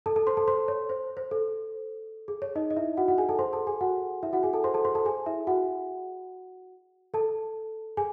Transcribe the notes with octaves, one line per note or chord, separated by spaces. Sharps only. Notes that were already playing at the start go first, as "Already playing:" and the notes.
A4 A5
A4 A5
C5 C6
A4 A5
C5 C6
C#5
C5
C5
A4
G#4
C#5
D#4 D#5
D#5
E4 E5
F#4 F#5
F#4 F#5
G#4 G#5
A4 A5
C5 C6
A4 A5
G#4 G#5
F#4 F#5
E4 E5
F#4 F#5
G#4 G#5
A4 A5
C5 C6
A4 A5
C5 C6
A4 A5
G#4 G#5
E4 E5
F#4 F#5
A4 A5
G#4 G#5